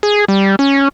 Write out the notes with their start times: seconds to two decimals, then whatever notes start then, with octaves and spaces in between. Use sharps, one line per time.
0.03 G#4
0.28 G3
0.59 C#4